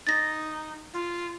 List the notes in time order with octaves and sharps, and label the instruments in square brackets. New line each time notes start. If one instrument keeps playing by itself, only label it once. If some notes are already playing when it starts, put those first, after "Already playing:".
[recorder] D#4 [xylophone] A6 A#6
[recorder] F4